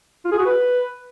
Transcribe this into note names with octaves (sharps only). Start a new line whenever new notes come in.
F4
G#4
F#4
B4